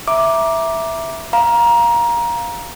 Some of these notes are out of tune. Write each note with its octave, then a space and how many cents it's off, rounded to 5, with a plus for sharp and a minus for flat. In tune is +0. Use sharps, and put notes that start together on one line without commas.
E5 +0 A#5 +20 D6 +0
F5 +0 A#5 +20